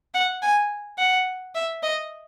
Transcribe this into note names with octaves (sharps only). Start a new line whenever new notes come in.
F#5
G#5
F#5
E5
D#5